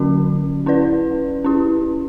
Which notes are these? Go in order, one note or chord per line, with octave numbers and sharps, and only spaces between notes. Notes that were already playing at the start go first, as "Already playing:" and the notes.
Already playing: D3 F#3 C#4 F#4
C#4 E4 B4 D5
C#4 E4 G4